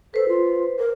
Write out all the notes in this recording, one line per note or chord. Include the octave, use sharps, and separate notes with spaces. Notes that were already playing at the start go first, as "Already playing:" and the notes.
A4 B4 C5
F4
A#4